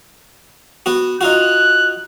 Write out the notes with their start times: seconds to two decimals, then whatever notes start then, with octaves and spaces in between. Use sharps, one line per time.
0.86 B3 F#4
1.21 D#4 F4 F#4 F#6